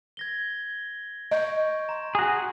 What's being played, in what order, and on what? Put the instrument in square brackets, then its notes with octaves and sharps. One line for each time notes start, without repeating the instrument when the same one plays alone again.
[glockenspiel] G#6 A#6 G7
[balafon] D#5 [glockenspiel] C#6 G6 D7
[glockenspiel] A#5 C6
[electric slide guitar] F#4 G#4